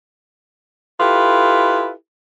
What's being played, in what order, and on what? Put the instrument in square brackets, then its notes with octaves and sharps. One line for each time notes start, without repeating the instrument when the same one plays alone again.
[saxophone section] E4 F4 G4 A4 B4